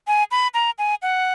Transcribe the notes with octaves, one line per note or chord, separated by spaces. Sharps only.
G#5
B5
A#5
G#5
F#5